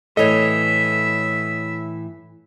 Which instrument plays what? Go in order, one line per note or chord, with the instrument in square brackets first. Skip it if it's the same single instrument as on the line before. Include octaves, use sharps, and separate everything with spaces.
[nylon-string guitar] A2 E3 A3 [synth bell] A4 C#5 [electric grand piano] D#5 [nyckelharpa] E5